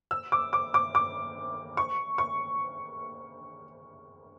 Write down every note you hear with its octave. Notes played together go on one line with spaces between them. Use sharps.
E6
D6
D6
D6
D6
C#6
C#6